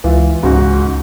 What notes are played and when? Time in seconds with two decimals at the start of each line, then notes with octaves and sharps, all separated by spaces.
0.04 C#2 E3 F4
0.43 C#2 G#2 C#3 F#4